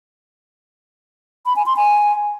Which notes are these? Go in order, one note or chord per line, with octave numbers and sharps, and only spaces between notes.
B5
G#5
C6
G#5